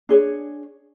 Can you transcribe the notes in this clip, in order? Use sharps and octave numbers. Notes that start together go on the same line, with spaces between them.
D4 G#4 C#5